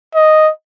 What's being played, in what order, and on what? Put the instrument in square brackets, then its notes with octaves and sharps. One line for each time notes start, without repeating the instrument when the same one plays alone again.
[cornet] D#5